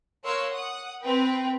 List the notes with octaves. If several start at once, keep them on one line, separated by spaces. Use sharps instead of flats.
A#4 C#5 F5 C6 E6 F#6
F#5 D#6
C4 B4 G5